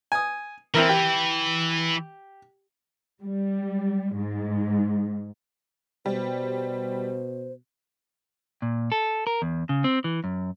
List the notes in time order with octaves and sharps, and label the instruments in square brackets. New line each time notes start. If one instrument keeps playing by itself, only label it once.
[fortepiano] G#5 D#6
[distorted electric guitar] E3 [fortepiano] C4 E4 A#4
[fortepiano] G4
[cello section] G3
G#2
[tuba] B2 [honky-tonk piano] G3 [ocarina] C5
[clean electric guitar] A#2
A4
A#4
E2
C#3
C4
E3
F#2